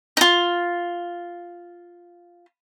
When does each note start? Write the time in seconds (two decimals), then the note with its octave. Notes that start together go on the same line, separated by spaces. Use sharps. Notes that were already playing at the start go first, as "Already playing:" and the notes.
0.17 D#4 F4